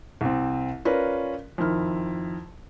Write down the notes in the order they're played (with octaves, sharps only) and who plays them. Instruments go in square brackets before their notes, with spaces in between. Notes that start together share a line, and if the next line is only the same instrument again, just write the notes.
[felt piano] C2 C4
C#4 F4 A#4 B4 D5
F2 D#3 E4 F6